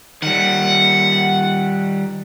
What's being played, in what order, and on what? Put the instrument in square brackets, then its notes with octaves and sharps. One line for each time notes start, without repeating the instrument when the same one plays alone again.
[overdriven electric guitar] D#3 G3 [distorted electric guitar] F#5